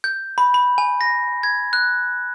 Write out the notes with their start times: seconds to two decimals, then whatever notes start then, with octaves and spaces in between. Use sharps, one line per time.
0.04 G6
0.38 B5
0.54 B5
0.78 G#5
1.01 A#6
1.43 G#6
1.73 F#6